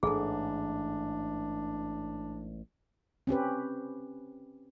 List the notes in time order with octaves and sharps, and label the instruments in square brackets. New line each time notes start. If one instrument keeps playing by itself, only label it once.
[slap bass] A1 G#2 [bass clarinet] D4 [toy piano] G#4 A4
[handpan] C4 C#4 G4 B4